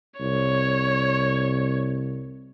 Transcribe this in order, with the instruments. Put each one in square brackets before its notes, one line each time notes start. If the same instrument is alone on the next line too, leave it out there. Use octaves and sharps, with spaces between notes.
[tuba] C2 [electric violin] C#5